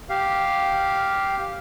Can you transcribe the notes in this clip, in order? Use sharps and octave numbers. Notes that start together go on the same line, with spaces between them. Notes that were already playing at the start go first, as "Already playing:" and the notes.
G4 F5